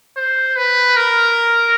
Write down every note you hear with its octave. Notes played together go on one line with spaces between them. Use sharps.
C5
B4
A#4